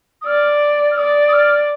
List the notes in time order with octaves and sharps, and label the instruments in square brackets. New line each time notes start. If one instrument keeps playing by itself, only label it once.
[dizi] D#6
[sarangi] D5 [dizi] F6
[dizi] F6
[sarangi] D5 [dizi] D#6
[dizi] D#6
F6